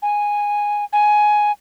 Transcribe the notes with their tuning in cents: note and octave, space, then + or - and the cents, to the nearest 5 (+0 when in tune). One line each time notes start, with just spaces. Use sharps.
G#5 -5
G#5 +10